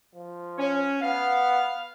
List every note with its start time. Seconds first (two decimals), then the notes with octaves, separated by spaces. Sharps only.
0.15 F3
0.58 C#4
1.01 B3 F5